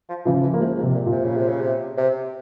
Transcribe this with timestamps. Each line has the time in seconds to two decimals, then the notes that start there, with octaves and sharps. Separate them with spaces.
0.09 F3
0.25 C#3 E3 F3
0.43 E3
0.54 A#3
0.60 C3 F3 G#3
0.78 G#2
0.83 C3
0.94 A#2
1.06 A#2
1.12 C3
1.24 C#3
1.37 C3
1.48 C#3
1.61 C3
1.98 C3